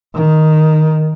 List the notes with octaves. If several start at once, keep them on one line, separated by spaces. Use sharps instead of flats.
D#3